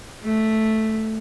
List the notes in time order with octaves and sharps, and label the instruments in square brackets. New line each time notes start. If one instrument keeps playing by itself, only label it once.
[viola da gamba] A3